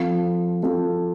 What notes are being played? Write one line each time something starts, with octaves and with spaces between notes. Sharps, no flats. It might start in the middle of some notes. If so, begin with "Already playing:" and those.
Already playing: F3 C4 F4 A4
F3 C4 F4 A4